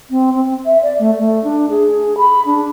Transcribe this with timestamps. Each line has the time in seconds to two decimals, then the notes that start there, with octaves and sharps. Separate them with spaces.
0.10 C4
0.34 C4
0.65 E5
0.83 D5
0.99 A3
1.18 A3
1.44 D4
1.70 G#4
2.18 B5
2.46 D4